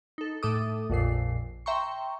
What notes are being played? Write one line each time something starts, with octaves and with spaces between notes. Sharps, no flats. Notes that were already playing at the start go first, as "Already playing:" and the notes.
D#4 A4
A2 A3 A4 E5 D6 D#6
A#1 F2 A#2 C7
E5 G5 A#5 C6 C#6